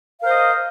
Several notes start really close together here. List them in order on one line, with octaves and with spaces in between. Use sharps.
F5 A#4 C5 D#5